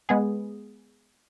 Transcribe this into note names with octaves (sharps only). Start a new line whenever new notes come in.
G#3 B3 G#4